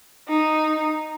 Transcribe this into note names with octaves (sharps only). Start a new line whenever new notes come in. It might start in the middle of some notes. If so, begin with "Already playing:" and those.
D#4